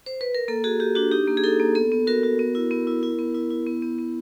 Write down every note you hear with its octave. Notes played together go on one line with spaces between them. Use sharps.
C5
B4
A#4
A#3 A4
F#4 G#4
F#4 G4
D4 F#4
D#4 G4
A#3
G#4
D#4 A4
A#3
B3 A4
B3
F#4 A#4
F#4
B3
E4
B3
E4
E4
B3
E4
E4
B3
B3
B3